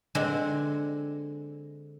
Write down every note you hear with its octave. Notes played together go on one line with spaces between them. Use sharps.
D3 G#3 C4